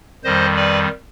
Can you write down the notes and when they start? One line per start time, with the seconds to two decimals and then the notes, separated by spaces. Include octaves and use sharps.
0.24 F2 D#3 G3 C5 D#5
0.56 B4 D5